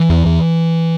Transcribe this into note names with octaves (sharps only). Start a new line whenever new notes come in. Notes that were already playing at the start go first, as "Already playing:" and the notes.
Already playing: E3
E2
E2